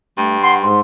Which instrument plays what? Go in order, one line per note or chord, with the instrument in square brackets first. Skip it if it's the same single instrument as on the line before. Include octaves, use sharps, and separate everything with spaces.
[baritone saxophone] G2 [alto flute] A3
[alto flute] F#5 [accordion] C6
[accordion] G#2 [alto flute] C6